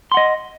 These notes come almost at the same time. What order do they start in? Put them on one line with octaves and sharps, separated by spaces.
C6 F#5 D#5